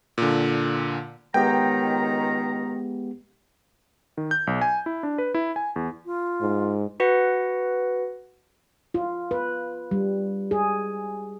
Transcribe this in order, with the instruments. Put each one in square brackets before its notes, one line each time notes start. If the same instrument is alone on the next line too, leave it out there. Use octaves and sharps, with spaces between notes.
[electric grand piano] A#2 D3
[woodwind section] C#2 D#3 A#5 [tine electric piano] G#3 B3 G4 [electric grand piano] G5
[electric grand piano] D#3
G6
B1
G#5
E4
D4
B4
E4
G#5
E2
[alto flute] F4
[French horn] G#2
[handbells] F#4 B4 F#5 A#6
[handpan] F4
B4
G3
G#4